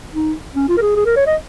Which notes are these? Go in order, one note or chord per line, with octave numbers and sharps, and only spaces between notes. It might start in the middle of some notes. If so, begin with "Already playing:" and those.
D#4
C#4
F4
A#4
G#4
G#4
A#4
C#5
D#5